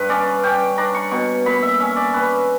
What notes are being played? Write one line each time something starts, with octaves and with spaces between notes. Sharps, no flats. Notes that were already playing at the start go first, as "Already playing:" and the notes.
Already playing: G2 B4
C#4 D5
C#4 G5
D4 A#5
C#6
B2 C#6
A#2 B5
E5
C#4 E5
D5
C#4 B4